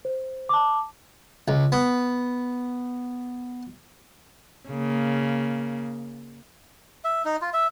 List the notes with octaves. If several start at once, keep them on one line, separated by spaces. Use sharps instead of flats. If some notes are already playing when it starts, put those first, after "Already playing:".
C5
A5 D6
C#2
B3
C#3 A#3
E5
D#4
F4
E5